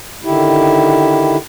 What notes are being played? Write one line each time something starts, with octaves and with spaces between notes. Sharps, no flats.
D3 D#3 E4 G4